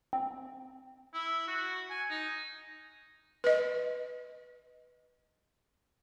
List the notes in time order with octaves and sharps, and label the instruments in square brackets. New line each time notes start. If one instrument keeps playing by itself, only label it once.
[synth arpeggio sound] C4
[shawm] E4
F#4
G#5
D#4
[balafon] B4 D#5